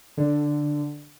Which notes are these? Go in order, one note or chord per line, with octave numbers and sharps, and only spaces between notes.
D3